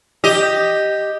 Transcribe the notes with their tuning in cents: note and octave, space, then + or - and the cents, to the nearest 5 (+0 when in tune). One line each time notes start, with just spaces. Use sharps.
G4 +0 D#5 +0